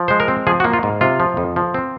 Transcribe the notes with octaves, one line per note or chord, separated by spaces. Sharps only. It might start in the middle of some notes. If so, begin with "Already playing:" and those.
Already playing: F3
G#3 C5
A#4
C4
F3 G#4
F#4
A#3
F4
G#2
C3 F4
F3
F2
F3
C4